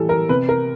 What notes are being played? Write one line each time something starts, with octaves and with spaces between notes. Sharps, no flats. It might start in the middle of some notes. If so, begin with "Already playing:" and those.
Already playing: A2 E3 G3 A4
A#4
C3 B4
A#4